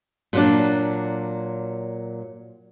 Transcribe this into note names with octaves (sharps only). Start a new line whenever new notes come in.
A#2 F#3 D4